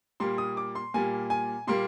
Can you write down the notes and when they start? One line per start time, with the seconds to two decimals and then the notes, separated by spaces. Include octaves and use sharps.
0.20 A#2 G3 A#3 C6
0.38 D#6
0.57 D6
0.75 C6
0.94 A#2 G3 A#3 G#5
1.30 G#5
1.67 A#2 G3 A#3 C6